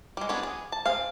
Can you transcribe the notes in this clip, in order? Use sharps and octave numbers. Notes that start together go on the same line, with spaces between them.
G3 G#3
B3 C#4 D4 F#4 C#5
G#4
A5
C4 G#4 F5